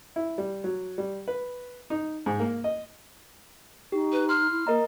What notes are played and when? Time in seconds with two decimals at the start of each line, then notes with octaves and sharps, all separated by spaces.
0.16 E4
0.38 G3
0.64 F#3
0.98 G3
1.28 B4
1.90 D#4
2.26 G#2
2.40 A#3
2.64 D#5
3.92 D#4 G4
4.12 B4
4.29 C6 F6
4.50 E4
4.67 A#3 A#4 D#5 A#5